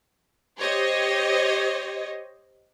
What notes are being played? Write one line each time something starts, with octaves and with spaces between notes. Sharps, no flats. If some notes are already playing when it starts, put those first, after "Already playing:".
G4 C5 C#5 D#5